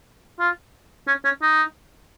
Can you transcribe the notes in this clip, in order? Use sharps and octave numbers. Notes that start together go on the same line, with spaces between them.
F4
C#4
C#4
D#4